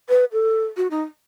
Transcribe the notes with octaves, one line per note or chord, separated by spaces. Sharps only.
B4
A4
F#4
D#4